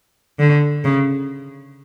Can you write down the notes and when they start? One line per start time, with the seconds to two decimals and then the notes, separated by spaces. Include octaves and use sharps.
0.39 D3
0.85 C#3